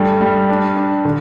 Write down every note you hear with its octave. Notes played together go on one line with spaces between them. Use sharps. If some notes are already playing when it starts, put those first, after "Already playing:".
Already playing: G2 G3 A3
G3
D4
D4
D3